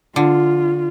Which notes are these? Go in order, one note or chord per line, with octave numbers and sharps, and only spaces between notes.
D3 F4